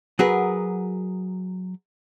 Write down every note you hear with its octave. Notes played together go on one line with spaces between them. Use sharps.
F#3 F#4 G#4 A#4 B4